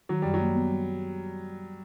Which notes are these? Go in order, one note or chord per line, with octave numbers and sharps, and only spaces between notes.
D#3 F#3
F#2 G3
F#3
A#3
B3
G3